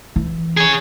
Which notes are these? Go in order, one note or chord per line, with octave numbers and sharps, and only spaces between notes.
E3
G#4 C#5